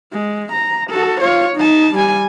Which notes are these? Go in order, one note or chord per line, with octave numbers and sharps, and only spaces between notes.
G#3
A#5
F#4 A4
F4 C#5
D#4 A5
G3 G#5